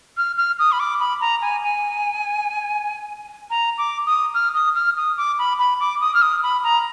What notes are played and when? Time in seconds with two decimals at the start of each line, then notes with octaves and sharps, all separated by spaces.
0.17 F6
0.37 F6
0.59 D#6
0.72 B5
0.80 D6
1.00 B5
1.21 A#5
1.42 G#5
1.63 G#5
3.50 A#5
3.78 D6
4.06 D#6
4.34 F6
4.55 D#6
4.76 F6
4.97 D#6
5.17 D6
5.39 B5
5.59 B5
5.80 D6
6.01 D#6
6.14 F6
6.22 D#6
6.43 B5
6.64 A#5